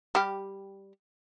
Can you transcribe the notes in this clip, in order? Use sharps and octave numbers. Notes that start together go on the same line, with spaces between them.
G3 G4